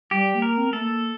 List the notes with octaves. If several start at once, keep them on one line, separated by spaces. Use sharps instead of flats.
G3 G4
A#3
A#4
C4
A3 A4
A#3